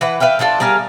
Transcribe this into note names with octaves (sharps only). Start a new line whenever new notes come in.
E3 B4 F#5
B4 E5 F5 G5
D3 D4 F4 A4
G3 G#4 A#4 F5